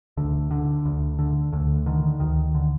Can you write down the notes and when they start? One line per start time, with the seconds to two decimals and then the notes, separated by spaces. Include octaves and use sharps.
0.17 D2 D3
0.51 D3
0.85 D2
1.19 D3
1.52 D2 D3
1.86 D3 D#3
2.20 D2 D#3
2.55 D3